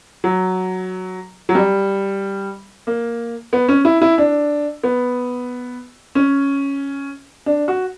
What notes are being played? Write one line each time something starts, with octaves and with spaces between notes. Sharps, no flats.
F#3
F#3
G3
A#3
B3
C#4
E4
E4
D4
B3
C#4
D4
F#4